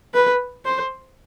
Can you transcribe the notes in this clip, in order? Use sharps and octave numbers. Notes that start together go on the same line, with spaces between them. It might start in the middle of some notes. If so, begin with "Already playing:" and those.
B4
C5